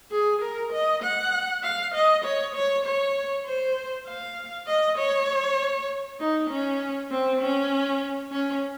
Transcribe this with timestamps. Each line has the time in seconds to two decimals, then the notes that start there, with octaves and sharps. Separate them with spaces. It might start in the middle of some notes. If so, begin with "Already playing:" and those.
0.11 G#4
0.42 A#4
0.73 D#5
1.03 F#5
1.63 F5
1.95 D#5
2.25 C#5
2.55 C#5
2.85 C#5
3.46 C5
4.07 F5
4.68 D#5
4.98 C#5
6.20 D#4
6.50 C#4
7.11 C4
7.42 C#4
8.32 C#4